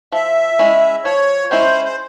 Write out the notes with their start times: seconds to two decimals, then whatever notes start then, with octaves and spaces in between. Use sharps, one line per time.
0.12 F3 E5
0.59 G#3 C#4 E4
1.04 F3 C#5
1.50 G#3 C#4 E4 C5
1.85 C5